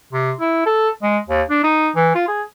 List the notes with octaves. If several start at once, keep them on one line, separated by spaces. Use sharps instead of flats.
C3
E4
A4
G#3
D#2
D4
D#4
E3
F4
G#4